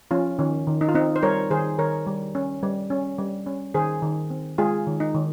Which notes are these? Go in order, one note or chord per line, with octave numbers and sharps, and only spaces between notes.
F3 C#4 F4
D#3 C#4
D#3
D#4
F4
C4 D#4
C5
G3 A#4 C#5
D#3 G#4 C5
D#3 A#4 C#5
G3
C#4
G3
C#4
G3
C#4
D#3 G#4 C5
D#3
C4
G#3 F4 G#4
D#3
D#4
D#3